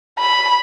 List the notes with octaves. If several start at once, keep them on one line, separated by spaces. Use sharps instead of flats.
B5